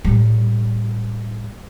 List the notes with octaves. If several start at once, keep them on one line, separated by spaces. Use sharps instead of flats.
A2 G3